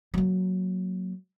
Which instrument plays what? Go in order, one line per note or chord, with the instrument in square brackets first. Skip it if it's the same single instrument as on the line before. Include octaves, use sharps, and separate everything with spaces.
[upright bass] F#3 A#3